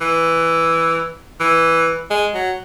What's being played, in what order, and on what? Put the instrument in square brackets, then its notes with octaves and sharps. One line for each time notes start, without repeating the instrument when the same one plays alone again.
[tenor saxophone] E3
E3
G#3
F#3